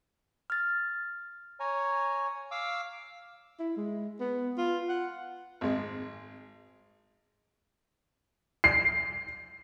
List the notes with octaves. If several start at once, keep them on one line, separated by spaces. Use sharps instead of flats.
F6 A6
C#5 G#5 A#5
F5 D6 E6
E4
G#3
B3
F4
F#5
G#1 G#3
C7